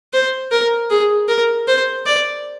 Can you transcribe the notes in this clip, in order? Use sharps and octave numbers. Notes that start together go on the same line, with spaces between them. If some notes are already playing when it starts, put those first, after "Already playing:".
C5
A#4
G#4
A#4
C5
D5